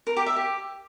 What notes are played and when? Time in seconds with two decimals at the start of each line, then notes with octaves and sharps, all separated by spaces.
0.07 A#4
0.17 G4
0.26 E5
0.36 G4